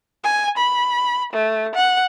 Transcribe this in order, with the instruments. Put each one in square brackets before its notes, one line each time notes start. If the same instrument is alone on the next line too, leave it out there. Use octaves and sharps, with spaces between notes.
[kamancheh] G#5
B5
A3
F#5